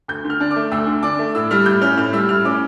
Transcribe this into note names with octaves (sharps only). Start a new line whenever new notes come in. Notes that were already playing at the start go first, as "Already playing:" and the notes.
D2 G6
D3
F6
D4
D6
A3
D2 E6
D3
D4 D6
A3
A2 E6
G3 F6
A2 G6
C#4 F6
A2 F6
G3 E6
A2 F6
C#4 D6